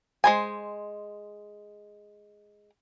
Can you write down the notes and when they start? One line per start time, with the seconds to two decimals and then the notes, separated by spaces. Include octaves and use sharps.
0.24 G#3 C5 G#5